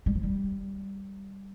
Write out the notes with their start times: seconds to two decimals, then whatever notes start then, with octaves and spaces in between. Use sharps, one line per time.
0.06 G3
0.15 F3
0.23 G3